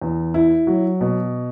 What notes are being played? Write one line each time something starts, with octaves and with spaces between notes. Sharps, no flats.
E2
E4
F#3
B2